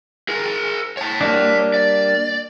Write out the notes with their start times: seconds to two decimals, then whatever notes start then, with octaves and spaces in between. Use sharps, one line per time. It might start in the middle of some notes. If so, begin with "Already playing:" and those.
0.29 G#4 A#4
0.97 C#5 A5
1.21 G3 A#3 D4
1.74 D5